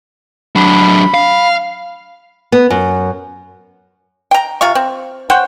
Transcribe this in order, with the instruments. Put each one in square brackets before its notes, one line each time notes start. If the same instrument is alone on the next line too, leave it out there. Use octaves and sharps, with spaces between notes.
[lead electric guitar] F#3 D4 [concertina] B5
[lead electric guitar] F5
[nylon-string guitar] B3
F#2
[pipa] G5 A#5
C3 F4 F5 C#6
C4
C5 C#5 F#5 G5